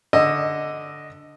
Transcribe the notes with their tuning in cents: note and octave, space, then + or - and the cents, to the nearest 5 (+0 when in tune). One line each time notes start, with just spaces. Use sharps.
D3 +0 D#5 +0 E6 +10